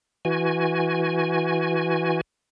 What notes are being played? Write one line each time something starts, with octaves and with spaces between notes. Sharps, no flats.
E3 F#4 G#5